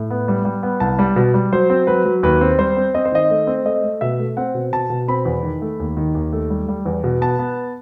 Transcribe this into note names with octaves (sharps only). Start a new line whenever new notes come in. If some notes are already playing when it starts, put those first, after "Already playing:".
Already playing: A2
B3
G3
G3
B3
C2 A5
G3
B2
G3
F#3 C5
C4
F#3 B4
F#3
D#2 B4
C4
G3 C5
C4
C4 D#5
C5
D#3 D#5
A3
C4
A3 D#5
A3
B2 E5
A3
C4 F#5
B2
B2 A5
B2
C4 B5
E2
D#3
A3
D#2
D#3
D#2
A3
G3
G3
E2
B2
B3 A5
B3